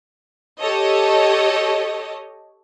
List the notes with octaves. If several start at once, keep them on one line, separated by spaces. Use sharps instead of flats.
G4 A4 C#5 D#5